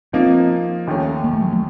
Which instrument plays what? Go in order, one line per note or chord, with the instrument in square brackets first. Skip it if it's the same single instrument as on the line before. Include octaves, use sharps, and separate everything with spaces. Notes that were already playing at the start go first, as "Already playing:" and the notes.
[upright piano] F3 A#3 D#4 [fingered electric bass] C4
[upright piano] D#2 D#3 A3 C#4
[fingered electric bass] A#3
A3
F#3
A3